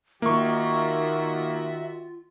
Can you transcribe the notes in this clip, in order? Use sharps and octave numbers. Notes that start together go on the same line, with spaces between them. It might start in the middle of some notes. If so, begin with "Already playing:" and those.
D#3 A#3 F4 F#4 E5 C#6